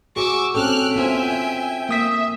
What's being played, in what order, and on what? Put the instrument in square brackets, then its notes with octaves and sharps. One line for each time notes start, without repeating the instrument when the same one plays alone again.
[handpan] F#4 G#4 [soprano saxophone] C#6 [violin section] D6 E6
[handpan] C4 C#4 A4 [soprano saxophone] G5 [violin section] F6 F#6
[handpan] B3 F4 C5 [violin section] E5 G#5
[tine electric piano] A#3 D#6 B6 [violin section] E5